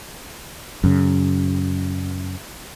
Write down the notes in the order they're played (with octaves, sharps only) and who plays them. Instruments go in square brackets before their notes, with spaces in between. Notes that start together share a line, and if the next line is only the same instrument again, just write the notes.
[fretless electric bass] F#2 C#3